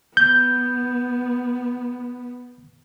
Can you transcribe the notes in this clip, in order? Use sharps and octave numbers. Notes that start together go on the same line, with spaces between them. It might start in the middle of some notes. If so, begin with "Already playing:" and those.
B3 G6